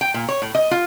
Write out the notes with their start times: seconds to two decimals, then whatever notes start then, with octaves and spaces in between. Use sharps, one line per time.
0.01 G5
0.14 A#2
0.29 C#5
0.42 A2
0.55 D#5
0.71 F4